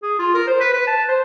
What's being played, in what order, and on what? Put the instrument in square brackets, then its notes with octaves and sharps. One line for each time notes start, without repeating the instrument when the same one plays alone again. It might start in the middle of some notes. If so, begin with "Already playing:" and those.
[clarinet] G#4
F4
A#4
C5
B4
B4
A5
C5